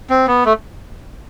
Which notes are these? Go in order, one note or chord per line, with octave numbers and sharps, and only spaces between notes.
C4
B3
A3